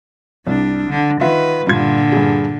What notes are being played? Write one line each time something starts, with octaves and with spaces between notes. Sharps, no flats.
C2 G3 D4
D3
D#3 F4 B4 E5 F#5
G2 A#2 D3 F4 G#6
G2 G#4